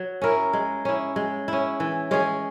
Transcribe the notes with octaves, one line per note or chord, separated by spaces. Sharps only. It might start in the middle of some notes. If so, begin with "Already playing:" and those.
Already playing: F#3
C#4 E4 A#4
G#3
C#4 E4
G#3
C#4 E4
E3
G#3 C#4 G#4